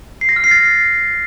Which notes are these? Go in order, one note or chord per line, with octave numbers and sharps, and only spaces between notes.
C7
A#6
F6
C7
A6